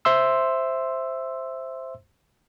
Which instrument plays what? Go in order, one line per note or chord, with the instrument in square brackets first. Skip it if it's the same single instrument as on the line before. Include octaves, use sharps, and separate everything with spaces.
[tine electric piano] C5 E5 C6 E6